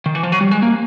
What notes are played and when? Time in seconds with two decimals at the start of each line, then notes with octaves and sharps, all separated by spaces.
0.06 D#3
0.15 E3
0.23 F3
0.32 F#3
0.41 G3
0.51 G#3
0.62 A#3